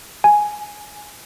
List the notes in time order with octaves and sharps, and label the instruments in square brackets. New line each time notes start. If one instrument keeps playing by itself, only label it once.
[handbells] G#5